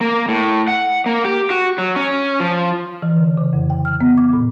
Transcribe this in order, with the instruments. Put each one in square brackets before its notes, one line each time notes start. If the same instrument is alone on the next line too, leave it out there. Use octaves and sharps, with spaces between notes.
[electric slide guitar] A#3
A2
F#5
A#3
G4
F#4
F#3
C#4
F3
[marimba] E3
D3
C#3
F2
G5
F6
B3
D6
A#2